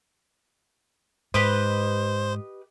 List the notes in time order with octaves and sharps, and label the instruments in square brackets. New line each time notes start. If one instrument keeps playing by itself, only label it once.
[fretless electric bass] G#2 [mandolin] G4 B4 D#5 [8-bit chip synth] C5